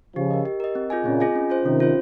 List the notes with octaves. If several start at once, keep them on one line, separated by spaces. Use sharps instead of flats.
C#3 F3 G4
A#4 D#5
G4
A#4 D#5
C4
F4 G#4 D#5 G#5
A#2 C#3 C4
F4 G#4 D#5 G#5
C#4
F4 C5
C3 D#3 C#4
F4 C5